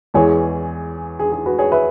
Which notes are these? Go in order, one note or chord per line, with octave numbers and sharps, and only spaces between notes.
E2 E3 G#3 G#4 C#5
G#4
G#4
F#4 B4
G#4 C#5
B4 E5